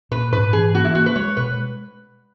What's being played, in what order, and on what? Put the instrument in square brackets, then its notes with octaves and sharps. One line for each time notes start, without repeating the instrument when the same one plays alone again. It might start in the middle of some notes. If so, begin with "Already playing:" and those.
[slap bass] A#2 [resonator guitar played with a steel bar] B4
[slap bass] G#2 [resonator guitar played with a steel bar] B4
[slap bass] E3 [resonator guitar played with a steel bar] G#4
[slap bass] A#3 [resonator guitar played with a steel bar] F#4
[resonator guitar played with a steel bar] E4
[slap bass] A#3 [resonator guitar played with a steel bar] F#4
[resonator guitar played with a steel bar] B4
[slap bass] G#3 [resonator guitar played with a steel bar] C#5
[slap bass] B2 [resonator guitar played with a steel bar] B4